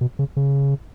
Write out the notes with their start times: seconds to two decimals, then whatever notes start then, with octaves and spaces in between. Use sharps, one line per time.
0.01 B2
0.19 C#3
0.37 C#3